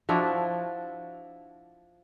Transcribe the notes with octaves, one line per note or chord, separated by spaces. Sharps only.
F3 D4 E4 F#4